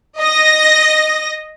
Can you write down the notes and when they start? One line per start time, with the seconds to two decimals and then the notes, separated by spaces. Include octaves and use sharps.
0.18 D#5 A#6